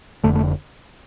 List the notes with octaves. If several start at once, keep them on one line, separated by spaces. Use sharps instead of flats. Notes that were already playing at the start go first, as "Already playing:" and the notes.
F1 F2 D3 A3
A3